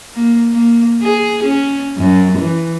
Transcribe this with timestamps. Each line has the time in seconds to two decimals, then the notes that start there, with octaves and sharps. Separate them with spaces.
0.15 A#3
0.52 A#3
1.02 G#4
1.43 C#4
1.97 F#2
2.38 E3